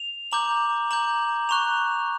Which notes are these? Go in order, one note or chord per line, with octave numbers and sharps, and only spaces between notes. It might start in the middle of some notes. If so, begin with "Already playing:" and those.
Already playing: F7
A#5 D6 G6 F#7
A#5 D6 G6 F#7
A#5 C#6 F#6 F7